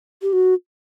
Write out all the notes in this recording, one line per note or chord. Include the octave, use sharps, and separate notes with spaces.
G4
F#4